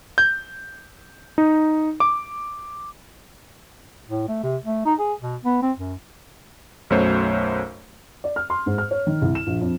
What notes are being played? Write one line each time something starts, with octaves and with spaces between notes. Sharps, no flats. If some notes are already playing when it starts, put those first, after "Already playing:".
G6
D#4
D6
A2
A3
C3
A3
D#4
G#4
B2
B3
C4
F#2
B1 F#2 F#3 A3 C5 C#5
D5
F6
C6
G#2
F6
C#5
D#3
C2
E7
A#1
F2